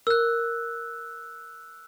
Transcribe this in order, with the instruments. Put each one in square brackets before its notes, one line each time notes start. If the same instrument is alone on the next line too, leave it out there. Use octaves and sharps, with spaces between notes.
[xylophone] A#4 [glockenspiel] E6 F#6